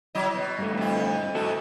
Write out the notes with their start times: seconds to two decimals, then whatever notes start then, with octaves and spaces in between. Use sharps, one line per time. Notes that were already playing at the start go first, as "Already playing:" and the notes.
0.15 F#3 E4 D#5
0.34 B2
0.59 G2 A3
0.77 F2 E4
1.35 G#2 A3 F#4 A4